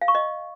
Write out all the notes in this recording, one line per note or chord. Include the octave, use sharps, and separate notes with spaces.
F5
C#6
D#5